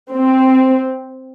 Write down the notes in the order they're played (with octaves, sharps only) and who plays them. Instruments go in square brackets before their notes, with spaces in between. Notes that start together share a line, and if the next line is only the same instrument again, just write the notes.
[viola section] C4